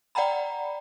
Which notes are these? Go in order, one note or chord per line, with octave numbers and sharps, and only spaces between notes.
D5 F#5 G5 A#5 B5